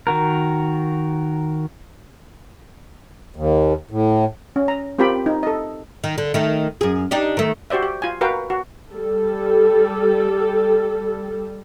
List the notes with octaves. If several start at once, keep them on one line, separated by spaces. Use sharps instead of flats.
D#3 F#4 A#4
D#2
A2
C#4
A#5
C4 F4 G4 A#4 G5 B5
D#4
A4 D#5
D#3
D3
D#3 A3
F#2 G#4
D4 D#4 G4
D#3 A3
F#4 G4 C5 D5 E5
G4
F4 G#5
F#4 A#4 B4 F5 G5
F#4
G3 A4